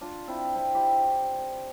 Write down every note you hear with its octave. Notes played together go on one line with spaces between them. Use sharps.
D4 F4
C4 E4
C4 E4
E4 G4